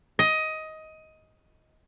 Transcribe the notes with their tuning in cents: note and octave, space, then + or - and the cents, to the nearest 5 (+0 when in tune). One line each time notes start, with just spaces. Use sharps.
D#5 +15